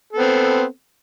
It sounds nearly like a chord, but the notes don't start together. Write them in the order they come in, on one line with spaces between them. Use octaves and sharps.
A4 B3 C4